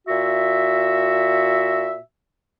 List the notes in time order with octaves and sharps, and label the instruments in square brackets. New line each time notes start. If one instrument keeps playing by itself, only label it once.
[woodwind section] A#2 F#4 E5